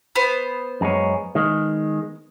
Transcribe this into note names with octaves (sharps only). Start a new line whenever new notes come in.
B3 C5
F#2 G#3 C#4
D#3 G#3